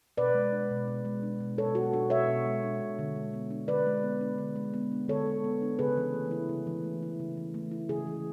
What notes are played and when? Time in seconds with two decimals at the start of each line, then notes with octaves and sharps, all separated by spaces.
0.17 B2 B4 D5
0.35 G#3
0.52 D4
0.71 B2
0.88 B2
1.05 G#3
1.23 D4
1.40 B2
1.58 B2 A4 C#5
1.75 G#3 F#4
1.93 D4 F#4
2.10 B2 C#5 E5
2.28 B2
2.46 G#3
2.63 D4
2.81 B2
2.99 D3
3.16 G#3
3.34 B3
3.51 D4
3.68 D3 B4 D5
3.87 G#3
4.04 B3
4.21 D4
4.38 D3
4.56 G#3
4.74 B3
4.92 D4
5.08 D3 A4 C#5
5.27 G#3
5.44 B3
5.62 D4
5.79 C#3 G#4 B4
5.97 E3
6.14 A3
6.31 E4
6.49 C#3
6.67 E3
6.84 A3
7.03 E4
7.20 C#3
7.37 E3
7.54 A3
7.72 E4
7.89 C#3 G#4
8.07 E3